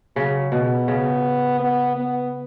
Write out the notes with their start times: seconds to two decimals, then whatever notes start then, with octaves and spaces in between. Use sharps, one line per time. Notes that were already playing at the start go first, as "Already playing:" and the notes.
0.16 C#3 F#3
0.52 B2 B3
0.88 C#3
1.60 B3
1.96 B3